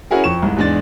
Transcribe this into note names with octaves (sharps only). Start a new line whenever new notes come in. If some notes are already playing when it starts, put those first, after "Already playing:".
C#4 E4 F#4 G#4 A#4
F2 C#6 E7
C2 G#2 G#3
E2 G#2 G#3 D4 A6